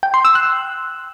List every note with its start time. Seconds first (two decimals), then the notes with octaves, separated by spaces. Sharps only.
0.03 G5
0.14 C6
0.25 E6
0.35 F#6